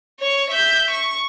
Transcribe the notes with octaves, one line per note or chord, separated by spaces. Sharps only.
C#5 C#6
E5 G6
C#6